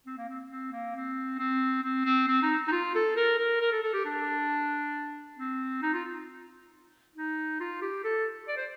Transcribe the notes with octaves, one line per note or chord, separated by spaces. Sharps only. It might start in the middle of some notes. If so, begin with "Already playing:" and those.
C4
A#3
C4
C4
A#3
C4
C4
C4
C4
C4
D#4
D#4
F4
A4
A#4
A#4
A#4
A4
A4
G4
D4
C4
D#4
F4
D#4
F4
G4
A4
D5
C5